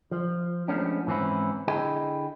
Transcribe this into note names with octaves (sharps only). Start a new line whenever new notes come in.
F3
F3 G#3 A3 B3 C#4 D4
G#2 E3 C4 C#4 E4
D3 E4 G#4 D#5 G5